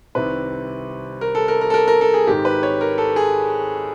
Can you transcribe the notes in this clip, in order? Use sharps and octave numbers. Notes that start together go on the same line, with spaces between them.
C2 C3 D#3 B4
A#4
A4
A#4
A#4
A4
A#4
A#4
A4
G#4
G#1 G#2 D#3 G4
B4
C#5
A#4
A4
G#4